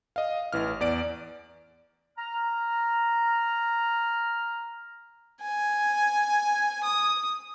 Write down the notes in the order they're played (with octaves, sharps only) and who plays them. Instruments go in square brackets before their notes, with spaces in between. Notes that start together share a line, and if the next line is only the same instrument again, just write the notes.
[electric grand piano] D#5 F5
A1 E3 F6
E2 D5 D7
[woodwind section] A#5 F6
[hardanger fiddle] G#5
D#6